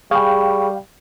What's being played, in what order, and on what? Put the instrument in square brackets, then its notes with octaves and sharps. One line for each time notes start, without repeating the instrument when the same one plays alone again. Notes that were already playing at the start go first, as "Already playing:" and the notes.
[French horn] G3 [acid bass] G#4 [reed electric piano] F5 G5 [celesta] B5 C#6